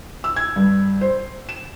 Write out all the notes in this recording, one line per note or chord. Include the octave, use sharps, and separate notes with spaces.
E6
G#6
G2
C5
E7